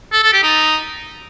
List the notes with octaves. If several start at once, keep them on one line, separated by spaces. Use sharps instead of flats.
A4
A4
G4
D#4